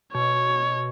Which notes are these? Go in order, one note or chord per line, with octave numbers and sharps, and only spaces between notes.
B2 C#5